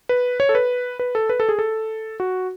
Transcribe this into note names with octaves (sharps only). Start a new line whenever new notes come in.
B4
C#5
A4
B4
B4
A4
B4
A4
G#4
A4
F#4